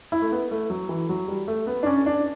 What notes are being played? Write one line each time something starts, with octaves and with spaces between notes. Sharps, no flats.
E4
A3
B3
A3
F#3
E3
F#3
G3
A3
B3
D4
C#4
D4